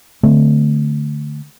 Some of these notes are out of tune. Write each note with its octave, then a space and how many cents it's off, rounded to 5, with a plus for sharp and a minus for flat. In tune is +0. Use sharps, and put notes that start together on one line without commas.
D3 +0 A3 +0 C4 -25